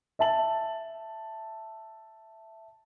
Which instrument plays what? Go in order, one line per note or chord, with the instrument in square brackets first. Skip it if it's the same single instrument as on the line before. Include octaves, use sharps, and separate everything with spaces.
[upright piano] E5 A5 F#7